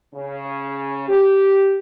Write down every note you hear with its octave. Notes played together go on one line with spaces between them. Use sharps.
C#3
G4